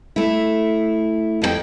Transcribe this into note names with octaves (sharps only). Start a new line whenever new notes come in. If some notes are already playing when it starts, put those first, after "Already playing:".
A3 E4
F2 F4 G5